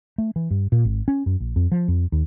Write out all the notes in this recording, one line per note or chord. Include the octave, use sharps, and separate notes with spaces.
A3
E3
G2
A#2
G#1
C#4
F#2
A#1
F2
F3
F2
D#2